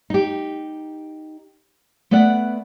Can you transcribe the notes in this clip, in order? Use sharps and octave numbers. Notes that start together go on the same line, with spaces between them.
D#4 G4
A3 B3 B4 D5 F#5